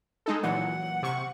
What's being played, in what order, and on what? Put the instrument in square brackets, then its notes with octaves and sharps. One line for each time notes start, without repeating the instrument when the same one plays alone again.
[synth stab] G#3 D#4 A4
[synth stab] A#2 E3 F#3 [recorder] F#5
[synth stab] C3 C#6